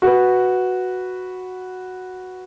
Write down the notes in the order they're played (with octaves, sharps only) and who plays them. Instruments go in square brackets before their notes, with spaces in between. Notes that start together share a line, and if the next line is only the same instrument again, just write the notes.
[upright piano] F#4 B4